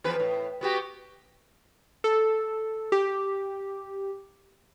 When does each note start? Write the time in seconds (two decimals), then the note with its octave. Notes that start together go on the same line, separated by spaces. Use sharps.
0.04 E2 F3 B4
0.20 A2
0.61 B3 F#4 G4
2.04 A4
2.92 G4